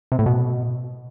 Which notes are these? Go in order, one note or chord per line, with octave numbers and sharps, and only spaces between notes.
C3
A2
B2